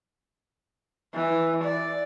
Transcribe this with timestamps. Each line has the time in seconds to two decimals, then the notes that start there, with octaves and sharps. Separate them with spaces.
1.14 E3
1.64 D5